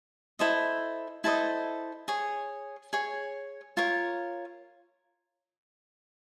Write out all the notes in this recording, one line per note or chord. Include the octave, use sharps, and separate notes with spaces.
E4 A4 C5 D#5
E4 A4 C5 D#5
G#4 C#5
G#4 C#5
F4 A#4 C#5